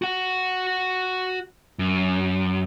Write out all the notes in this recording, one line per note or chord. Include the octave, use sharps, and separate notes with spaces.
F#4 F#5
F#2